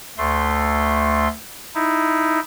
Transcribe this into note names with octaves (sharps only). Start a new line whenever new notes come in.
D2 A3 C6
D#4 E4